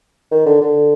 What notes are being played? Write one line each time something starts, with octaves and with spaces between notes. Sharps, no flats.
D#3
D3
D3